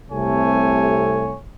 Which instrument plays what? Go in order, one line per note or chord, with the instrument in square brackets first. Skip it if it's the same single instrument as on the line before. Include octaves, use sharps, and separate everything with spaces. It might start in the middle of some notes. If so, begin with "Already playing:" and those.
[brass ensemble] C2 C3 A3 A4 C#5 G#5